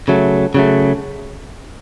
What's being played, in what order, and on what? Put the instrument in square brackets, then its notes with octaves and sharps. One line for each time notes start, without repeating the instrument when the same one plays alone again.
[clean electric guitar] C#3 F#3 A3
C#3 F#3 A3